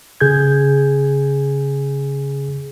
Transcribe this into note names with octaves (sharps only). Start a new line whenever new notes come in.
C#3 G#4 G6 G#6